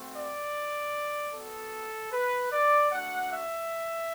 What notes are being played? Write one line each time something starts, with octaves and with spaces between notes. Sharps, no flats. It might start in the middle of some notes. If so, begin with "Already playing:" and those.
Already playing: A3 C4 F#4
D5
B3 F#4 A4
B4
D5
A3 D4 F#4 F#5
E5